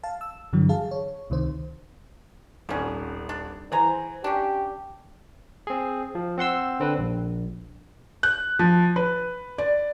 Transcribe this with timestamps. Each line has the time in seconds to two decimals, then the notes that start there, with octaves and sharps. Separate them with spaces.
0.03 F5 A5
0.21 E6
0.53 G2 D3 E3 F#3
0.69 G#4 F5 A5
0.91 C#5
1.30 C#2 C3 D#3 C5
2.69 D#1 G#1 D3 C#4
3.29 D4
3.72 E3 G#4 C5 G#5 A#5
4.24 C#4 D4 G4
5.67 C4 G#4
6.15 F3
6.38 C4 F#5 C6 E6
6.80 D3 C4 D4 B4
6.99 A#1
8.23 F#6
8.59 F3
8.96 B4
9.58 D5